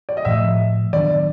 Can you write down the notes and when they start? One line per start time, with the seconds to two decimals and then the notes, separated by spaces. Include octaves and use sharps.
0.09 D5
0.17 D#5
0.25 A2 F3 A3 E5
0.93 D#3 F#3 B3 D4 D5